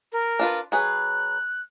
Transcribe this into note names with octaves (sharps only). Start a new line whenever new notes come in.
A#4
D4 F4 B4
F#3 G#4 B4 F#6